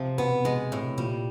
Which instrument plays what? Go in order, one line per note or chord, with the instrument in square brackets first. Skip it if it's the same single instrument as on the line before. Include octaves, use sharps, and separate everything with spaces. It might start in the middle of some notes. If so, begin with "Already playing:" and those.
Already playing: [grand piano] C3 [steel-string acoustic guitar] F3
[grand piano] B2 [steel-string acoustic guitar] B3
[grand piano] B2 [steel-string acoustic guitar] G#3
[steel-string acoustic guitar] A2 [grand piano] C3
[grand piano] A#2 [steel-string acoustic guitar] G3